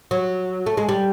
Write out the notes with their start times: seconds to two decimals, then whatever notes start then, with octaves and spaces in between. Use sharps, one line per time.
0.11 F#3
0.66 A3
0.77 G#3
0.89 G3